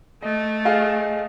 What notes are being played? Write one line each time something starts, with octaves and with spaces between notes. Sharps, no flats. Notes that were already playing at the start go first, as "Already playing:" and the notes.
A3 D#5
G#4 D#5 F5